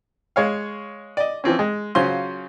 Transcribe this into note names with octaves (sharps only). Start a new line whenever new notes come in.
G#3 C#5 F5
D5 D#5
E3 F3 C4 C#4
G#3
C#3 F#3 C#4 F4 C5 C6